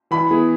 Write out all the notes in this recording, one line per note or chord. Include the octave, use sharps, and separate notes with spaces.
E3 B5
B3 E4 G#4